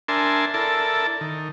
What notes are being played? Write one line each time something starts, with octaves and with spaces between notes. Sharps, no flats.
D4 A#4 E5 G#5 A5 C6
E4 A4 A#4 D5 A5
D#3